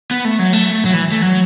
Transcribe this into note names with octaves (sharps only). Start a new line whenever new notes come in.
B3
A3
F#3
A3
F#3
E3
A3
F#3